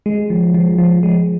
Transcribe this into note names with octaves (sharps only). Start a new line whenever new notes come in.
G#3
F3
F3
F3
G#3